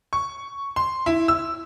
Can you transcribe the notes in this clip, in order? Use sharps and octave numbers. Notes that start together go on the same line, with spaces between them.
C#6
C6
E4
E6